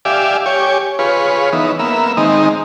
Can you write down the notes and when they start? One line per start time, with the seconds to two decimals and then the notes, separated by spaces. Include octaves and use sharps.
0.05 G4 D5 E5 F5 G#5
0.46 G4 C#5 G#5
0.99 F4 G#4 B4 C#5
1.53 E3 B3 D#4
1.79 A#3 B3 E5
2.17 D#3 G#3 C4 D#4